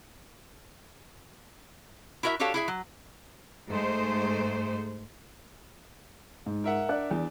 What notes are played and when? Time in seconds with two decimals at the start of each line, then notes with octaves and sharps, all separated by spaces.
2.23 E4 F#4 A#4 C#5 E5
2.39 D4 F#4 G4 A4 C#5 F5
2.54 E4 G#4 E5
2.68 F#3
3.69 G#2 G#3 A3 C5
6.46 G#2
6.64 A#4 E5 F#5
6.89 D4 D5 F#6
7.11 E2